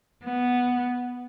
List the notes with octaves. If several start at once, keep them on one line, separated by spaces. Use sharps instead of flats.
B3